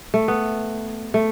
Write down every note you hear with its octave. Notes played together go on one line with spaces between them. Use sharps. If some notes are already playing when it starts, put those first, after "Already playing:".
A3
B3
A3